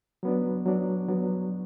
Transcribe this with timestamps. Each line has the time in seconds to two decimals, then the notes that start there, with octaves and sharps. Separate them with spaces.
0.23 F#3 B3 D4
0.66 F#3 B3 D4
1.09 F#3 B3 D4